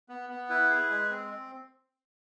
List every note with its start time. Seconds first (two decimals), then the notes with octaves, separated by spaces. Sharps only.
0.09 B3
0.29 B3
0.49 E4 B4
0.70 G#4
0.90 G#3
1.11 C4